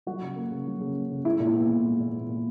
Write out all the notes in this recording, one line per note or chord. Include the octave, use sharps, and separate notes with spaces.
F#3 F#4
C#3
A#3
C#3
F#3
C#3
A#3
C#3
G#3 E4
A#2
E4
B3
A#2
G#3
A#2
B3
A#2